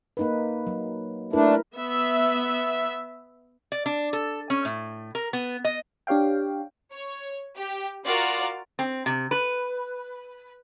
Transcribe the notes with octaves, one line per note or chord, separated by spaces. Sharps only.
A#3 D#4 B4
F#3
A3 D4 E4 A#4 B4
B3 E5
D5
D4
A4
C#4
A2
A#4
B3
D#5
D4 G4 C#5 F5 G5
C#5
G4
F4 F#4 A#4 D5 F5
C4
C3
B4